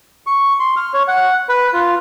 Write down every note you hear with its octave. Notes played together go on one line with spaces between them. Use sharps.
C#6
C6
F6
C#5
F#5
B4
F4